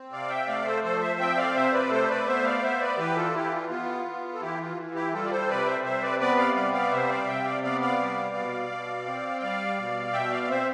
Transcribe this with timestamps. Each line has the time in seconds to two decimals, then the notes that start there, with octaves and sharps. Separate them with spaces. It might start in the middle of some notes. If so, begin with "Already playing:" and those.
Already playing: C4
0.11 C3 D5 F5
0.29 E5 G5
0.48 A3 D5 F5
0.65 A4 C5
0.83 F3 A4 C5
1.01 C5 E5
1.19 C4 E5 G5
1.37 D5 F5
1.55 C3 C5 E5
1.72 B4 D5
1.90 A3 A4 C5
2.08 B4 D5
2.27 B3 C5 E5
2.44 D5 F5
2.62 B3 C5 E5
2.80 B4 D5
2.98 E3 G4 B4
3.16 F4 A4
3.34 E3 E4 G4
3.51 F4
3.69 B3 F4
4.05 B3
4.34 A4
4.41 E3 E4 G4
4.60 F4
4.76 E3
4.95 E4 G4
5.13 G3 F4 A4
5.26 D5
5.31 A4 C5
5.49 C3 B4 D5
5.66 C5 E5
5.84 C3 C5 E5
6.02 B4 D5
6.20 B3 B4 D5
6.37 D5 F5
6.56 G3 D5 F5
6.74 D5 F5
6.91 C3 C5 E5
7.09 D5 F5
7.27 C3 E5 G5
7.45 D5 F5
7.63 B3 D5 F5
7.81 D5 F5
7.99 G3
8.35 B2
8.70 B2
9.06 C4
9.38 G5
9.41 G3 D5 F5
9.78 B2
10.13 B2 E5 G5
10.31 D5 F5
10.43 D5
10.49 C4 C5 E5